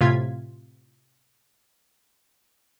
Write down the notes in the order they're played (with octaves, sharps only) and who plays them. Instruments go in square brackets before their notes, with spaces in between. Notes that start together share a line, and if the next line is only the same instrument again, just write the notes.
[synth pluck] A2 C3 F4 G#6 B6